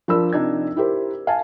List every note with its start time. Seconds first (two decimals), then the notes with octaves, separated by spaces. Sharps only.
0.08 F3 D4 A#4 B5 E6
0.33 C3 D4 D#4 F4 D5 G#6
0.76 E4 G4 A#4 C5
1.27 F5 G#5 A5